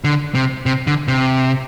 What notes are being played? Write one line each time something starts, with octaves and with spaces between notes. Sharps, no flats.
D3
C3
C3
D3
C3